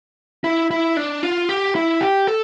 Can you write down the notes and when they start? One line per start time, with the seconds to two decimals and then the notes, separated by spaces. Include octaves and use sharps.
0.44 E4
0.71 E4
0.97 D4
1.23 F4
1.49 G4
1.75 E4
2.01 G4
2.27 A4